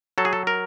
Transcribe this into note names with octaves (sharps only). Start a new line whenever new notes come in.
F#3 A4
G#4
A4
A#4